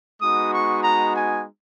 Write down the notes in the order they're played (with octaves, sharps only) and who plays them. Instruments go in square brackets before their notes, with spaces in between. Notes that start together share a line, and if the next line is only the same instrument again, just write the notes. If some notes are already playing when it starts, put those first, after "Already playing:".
[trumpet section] G#3 B3 D#4 F#4 D#6
C#6
A#5
G#5